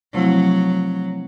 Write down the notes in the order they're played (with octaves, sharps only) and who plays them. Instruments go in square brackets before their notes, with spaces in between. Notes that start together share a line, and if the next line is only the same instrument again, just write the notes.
[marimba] C3 F3 A3 C4 E4 [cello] F#3